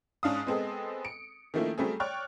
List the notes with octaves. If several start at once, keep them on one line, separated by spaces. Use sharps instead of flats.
G#2 C#4 D4 F5 D#6
G#3 B3 C4 G#4 A4
C#7 D7
D#3 F3 A3 A#3 C#4 E4
F#3 G3 A3 C4 G#4
C#5 D5 G5 C#6 F6 F#6